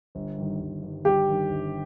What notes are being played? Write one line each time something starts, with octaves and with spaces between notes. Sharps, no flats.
G1
G2 D#3
G1
G2 D#3
G1 G4
G2 D#3
G1